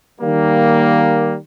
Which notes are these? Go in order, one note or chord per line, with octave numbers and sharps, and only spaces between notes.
D#3 G3 A#3